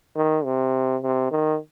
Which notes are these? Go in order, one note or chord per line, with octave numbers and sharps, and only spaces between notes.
D#3
C3
C3
D#3